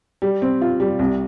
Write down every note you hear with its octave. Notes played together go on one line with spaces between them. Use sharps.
G3
C4
F4
G3
C2